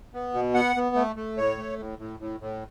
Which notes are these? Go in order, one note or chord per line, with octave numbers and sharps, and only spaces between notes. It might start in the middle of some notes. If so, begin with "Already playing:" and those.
B3
B2
B3 F#5
B3
A3
A3
A2 C#5
A3
A2
A2
A2
A2